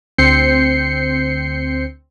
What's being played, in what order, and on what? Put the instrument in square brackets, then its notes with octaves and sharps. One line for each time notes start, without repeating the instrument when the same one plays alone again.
[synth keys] D2 C4 G6 C7 C#7